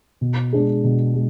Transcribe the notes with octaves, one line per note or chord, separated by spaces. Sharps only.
B2
G#3 D4 G#4
B2
G#3